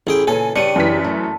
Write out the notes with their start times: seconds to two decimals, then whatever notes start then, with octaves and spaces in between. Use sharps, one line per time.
0.07 A1 E4 G#4 G5
0.27 A#2 C#3 E3 A4 G#5
0.56 G2 C#3 G3 D4 C#7 D#7
0.76 F#2 E3 B6
1.04 A3